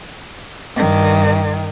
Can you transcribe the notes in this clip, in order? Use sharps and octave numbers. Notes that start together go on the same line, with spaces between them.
G2 D#3